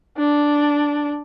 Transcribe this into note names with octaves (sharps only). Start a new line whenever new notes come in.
D4